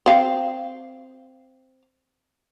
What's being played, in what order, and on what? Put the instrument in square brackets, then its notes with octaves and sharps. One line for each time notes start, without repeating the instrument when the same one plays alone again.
[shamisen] C4 F5